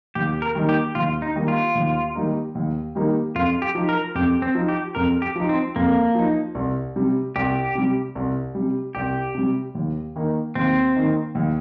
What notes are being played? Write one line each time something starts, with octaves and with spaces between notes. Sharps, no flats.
D#2 G4
A#4
D#3 G3 A#3 D#4
G4
D#2 F4
D#4
D#3 G3 A#3 D#4
F4
D#2
D#3 G3 A#3 D#4
D#2
D#3 G3 A#3 D#4
F2 F4
G4
F3 D#4
A#4
F2 G4
C4
F3 D#4
G4
F2 A#4
G4
F3 D#4
C4
F2 A#3
F3 D#4
C2
C3 G3
C2 G4
C3 G3
C2
C3 G3
C2 G4
C3 G3
D#2
D#3 A#3 D#4
D#2 C4
D#3 A#3 D#4
D#2